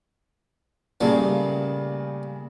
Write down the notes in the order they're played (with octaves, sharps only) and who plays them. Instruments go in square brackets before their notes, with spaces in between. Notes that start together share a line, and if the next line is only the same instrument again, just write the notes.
[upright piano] A#2 C#3 G#4 [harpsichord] G3 A3 A#3